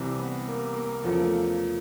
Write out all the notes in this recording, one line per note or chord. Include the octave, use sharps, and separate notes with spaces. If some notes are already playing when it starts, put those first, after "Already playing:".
Already playing: C2 C3 E3 G3
B3 B4
A#3 A#4
A#3 A#4
E2 C#3 F3 A4
A#4
A3 A4